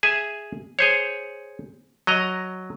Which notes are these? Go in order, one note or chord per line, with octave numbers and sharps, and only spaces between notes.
G#4 E5 G#5
G#4 C5 C#5
F#3 D#5 A#5